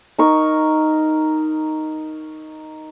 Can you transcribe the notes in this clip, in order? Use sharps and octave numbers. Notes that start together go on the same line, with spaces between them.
D#4 A#4 C#6